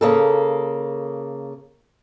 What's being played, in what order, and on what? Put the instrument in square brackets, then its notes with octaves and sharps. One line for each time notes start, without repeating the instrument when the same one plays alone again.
[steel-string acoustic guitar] C#3 A#3 A4